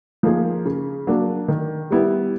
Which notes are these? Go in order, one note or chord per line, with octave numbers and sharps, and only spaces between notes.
F3 A#3 D#4 G#4
C#3
F#3 A#3 D4
D#3
G3 B3 E4